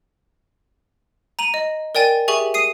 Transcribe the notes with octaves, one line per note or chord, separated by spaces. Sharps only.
A#5 D#7 F#7
D#5
A#4 D5 G5 G#5 A6
G4 G#4 E5 G#5 C#6 F#7
D#6 C7 D#7